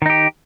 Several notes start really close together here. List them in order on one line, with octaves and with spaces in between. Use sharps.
D#3 D#4 G4